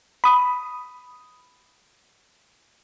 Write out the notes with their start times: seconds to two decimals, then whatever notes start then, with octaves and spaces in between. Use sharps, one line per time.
0.24 B5 D#6